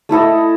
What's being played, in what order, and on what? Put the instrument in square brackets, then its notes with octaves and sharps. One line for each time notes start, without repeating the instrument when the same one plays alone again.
[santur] A3 E4 A4 D#5